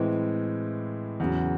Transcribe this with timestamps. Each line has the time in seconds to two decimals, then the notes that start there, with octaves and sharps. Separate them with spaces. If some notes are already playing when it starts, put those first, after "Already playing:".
Already playing: A2 E3 G#3 C4
1.20 E2 C#3 F#3